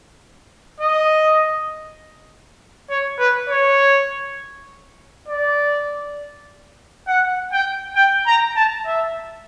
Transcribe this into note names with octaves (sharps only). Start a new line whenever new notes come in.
D#5
C#5
B4
C#5
D5
F#5
G5
G5
A#5
A5
E5